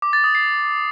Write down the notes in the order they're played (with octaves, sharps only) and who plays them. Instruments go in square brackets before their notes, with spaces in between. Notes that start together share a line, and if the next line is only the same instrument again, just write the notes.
[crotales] D6
A6
D#6
C7